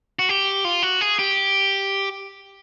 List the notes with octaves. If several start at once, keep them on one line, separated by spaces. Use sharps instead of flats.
F#4
G4
F4
F#4
G#4
G4